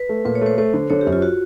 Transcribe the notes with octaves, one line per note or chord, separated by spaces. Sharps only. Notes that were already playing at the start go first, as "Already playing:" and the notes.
Already playing: B4
A3
A#2 B4
C#5
A3 C5
A3 C5
D3
D3 C#5
G4
F#2
F4
F#4